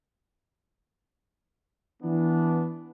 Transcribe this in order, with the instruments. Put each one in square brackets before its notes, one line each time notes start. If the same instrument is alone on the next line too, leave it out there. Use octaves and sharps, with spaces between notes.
[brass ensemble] E3 B3 D4